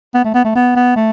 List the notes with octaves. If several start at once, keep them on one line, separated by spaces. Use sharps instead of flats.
B3
A3
B3
A3
B3
B3
A3